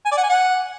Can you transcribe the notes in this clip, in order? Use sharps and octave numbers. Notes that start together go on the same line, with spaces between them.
G#5
D5
F#5
G#5
F#5